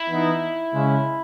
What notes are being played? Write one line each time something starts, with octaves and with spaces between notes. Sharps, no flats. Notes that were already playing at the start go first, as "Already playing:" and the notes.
Already playing: E4
E3 B3 D#4
C#3 G#3 C#4